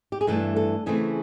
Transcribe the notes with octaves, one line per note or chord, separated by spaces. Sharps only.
G4
G#4
G2 E3 A3 D4 A4
A4
C#3 E3 A3 C4 G#4